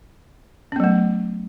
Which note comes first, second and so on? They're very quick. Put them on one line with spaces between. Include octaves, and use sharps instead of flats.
C#4 B3 F#3 A3